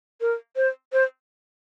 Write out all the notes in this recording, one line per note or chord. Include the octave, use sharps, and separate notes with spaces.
A#4
C5
C5